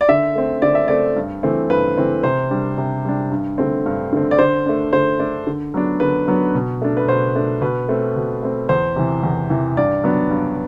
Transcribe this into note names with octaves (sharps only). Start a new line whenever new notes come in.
D5
D3 E5
A3 C4
D3 D5
E5
A3 C4 D5
G2
E3 A3 C4
G2 B4
E3 A3 C4
C3 C5
G3 D4
C3
G3 D4
G2
D3 A3 C4
G2
D3 A3 C4
D5
D3 C5
A3 D4
D3 C5
A3 D4
D3
F#3 B3 D4
D3 B4
F#3 B3 D4
B2
A3 D4
B4
B2 C5
A3 D4
B2 B4
A3 C4
B2
A3 C4
E2 C5
C3 E3
E2
C3 E3
G2 D5
F#3 B3 D4
G2